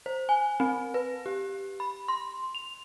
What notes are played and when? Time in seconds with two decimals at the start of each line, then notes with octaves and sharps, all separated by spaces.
0.06 C5
0.29 G#5
0.60 C4
0.94 B4
1.26 G4
1.80 B5
2.08 C6
2.55 F7